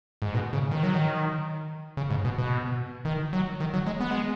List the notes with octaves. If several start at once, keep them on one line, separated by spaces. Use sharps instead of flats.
G#2
B2
C#3
D#3
F#3
D#3
C#3
G#2
B2
B2
D#3
F#3
D#3
F#3
G#3
B3
G#3